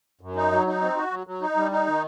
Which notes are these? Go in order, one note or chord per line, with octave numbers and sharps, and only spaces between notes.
F#2
D#4
F#3
D#4
C4
F#4
F#3
F#3
D#4
G3
D#4
D#3